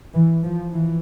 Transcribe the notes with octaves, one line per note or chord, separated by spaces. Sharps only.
E3
F3
E3